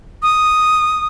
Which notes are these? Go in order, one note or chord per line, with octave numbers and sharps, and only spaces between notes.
D#6